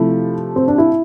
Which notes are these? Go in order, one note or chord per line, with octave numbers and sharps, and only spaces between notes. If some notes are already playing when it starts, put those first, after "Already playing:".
Already playing: C3 F3 A3 E4
C4
D4
E4